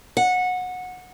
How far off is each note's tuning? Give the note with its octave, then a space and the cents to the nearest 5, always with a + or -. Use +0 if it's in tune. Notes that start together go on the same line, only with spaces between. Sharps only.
F#5 -20